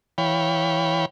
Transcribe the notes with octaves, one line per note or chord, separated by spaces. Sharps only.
E3 C#5 F5 G5 B5